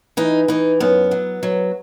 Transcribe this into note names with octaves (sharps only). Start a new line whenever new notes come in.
E3 D#4
E3 D#4
F#2 B3
F#3
F#3